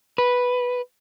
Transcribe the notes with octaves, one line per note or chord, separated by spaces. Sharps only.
B4